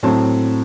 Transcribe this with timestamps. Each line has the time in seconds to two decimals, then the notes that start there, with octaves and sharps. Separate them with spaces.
0.03 A2 F#3 C4 A5